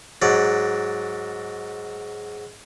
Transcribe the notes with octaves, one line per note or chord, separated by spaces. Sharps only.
G#2 F#3 D5